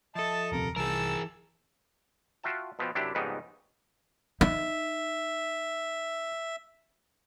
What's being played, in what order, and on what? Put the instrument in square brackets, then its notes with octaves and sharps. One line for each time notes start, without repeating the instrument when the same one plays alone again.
[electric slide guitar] F3 A4 [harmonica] D#5 E5 A5
[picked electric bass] D#1 F2 C3 [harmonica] A#4
[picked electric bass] C2 [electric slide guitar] E3 [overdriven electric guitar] G#4 A#4 [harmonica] A5 E6
[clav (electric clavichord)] F4 F#4 E5 G5 A5
B2 F3 B3 C4
F#2 C3 D4 E4 G4
F2 G#2 C#3 G3 B3 D#4
[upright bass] D#4 [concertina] E5